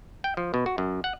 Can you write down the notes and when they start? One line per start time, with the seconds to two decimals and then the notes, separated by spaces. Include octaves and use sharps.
0.24 G5
0.37 F3
0.54 B2
0.66 F#4
0.78 F#2
1.04 F#5